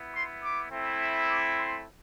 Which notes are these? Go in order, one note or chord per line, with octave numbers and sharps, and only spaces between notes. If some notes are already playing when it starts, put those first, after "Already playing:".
Already playing: B3 E4
C6
D6
A3 C4 E4
D6
C6